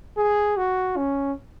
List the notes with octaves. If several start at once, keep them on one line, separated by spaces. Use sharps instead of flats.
G#4
F#4
C#4